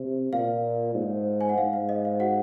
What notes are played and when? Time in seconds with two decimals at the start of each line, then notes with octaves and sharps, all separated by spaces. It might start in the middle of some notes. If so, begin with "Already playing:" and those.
Already playing: C3
0.33 A#2 F5
0.95 G#2
1.41 G#5
1.49 F#5
1.58 G#2 F5
1.73 F5
1.89 D#5
2.05 F5
2.20 F#4 F#5